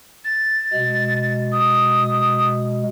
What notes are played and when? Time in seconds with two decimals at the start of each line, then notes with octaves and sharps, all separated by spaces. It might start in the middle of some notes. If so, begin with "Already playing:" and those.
0.24 A6
0.73 B2 G#3
1.52 D#6